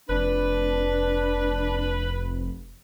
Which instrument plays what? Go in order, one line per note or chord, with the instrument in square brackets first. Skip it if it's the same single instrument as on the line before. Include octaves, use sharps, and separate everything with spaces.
[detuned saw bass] F1 [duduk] D4 [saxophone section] B4